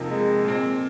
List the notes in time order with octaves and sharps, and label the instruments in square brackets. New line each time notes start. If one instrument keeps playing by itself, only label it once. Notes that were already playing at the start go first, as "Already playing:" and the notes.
Already playing: [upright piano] F2 C3 F3 A#3 D#4
[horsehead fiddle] G#3
[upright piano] A#2 F3 C4